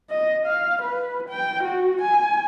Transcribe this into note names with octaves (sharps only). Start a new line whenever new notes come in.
D#5
F5
B4
G5
F#4
G#5